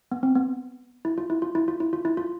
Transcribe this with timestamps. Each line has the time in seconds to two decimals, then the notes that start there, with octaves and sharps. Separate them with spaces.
0.12 B3
0.23 C4
0.35 B3
1.05 E4
1.18 F4
1.30 E4
1.42 F4
1.55 E4
1.68 F4
1.80 E4
1.93 F4
2.05 E4
2.17 F4